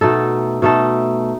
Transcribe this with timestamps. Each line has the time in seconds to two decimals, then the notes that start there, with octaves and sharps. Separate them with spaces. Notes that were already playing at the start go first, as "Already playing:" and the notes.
0.01 B2 A3 D#4 A4
0.62 B2 A3 D#4 A4